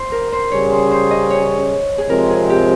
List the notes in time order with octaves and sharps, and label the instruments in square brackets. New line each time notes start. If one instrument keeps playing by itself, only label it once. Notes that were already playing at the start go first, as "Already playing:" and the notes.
Already playing: [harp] C5
A#4
C5
[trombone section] C#3 G3 C#4 G#4 [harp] C#5
[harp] C5
C5
D#5
C#5
G#4
[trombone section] C3 F3 G#3 C4 [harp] A#4
[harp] G#4
G4